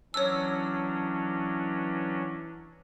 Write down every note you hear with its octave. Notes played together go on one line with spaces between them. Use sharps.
E3 F#3 C#4 D4 C#5 E6